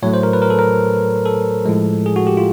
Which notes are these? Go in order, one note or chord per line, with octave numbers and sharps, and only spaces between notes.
A2 F#3 A3 C#5
C5
A#4
B4
A#4
A4
A#4
A4
A2 F3 G#3
G#4
F#4
G4
F4